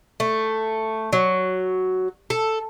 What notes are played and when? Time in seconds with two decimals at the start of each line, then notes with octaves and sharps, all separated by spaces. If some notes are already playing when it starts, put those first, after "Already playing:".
0.20 A3
1.13 F#3
2.30 A4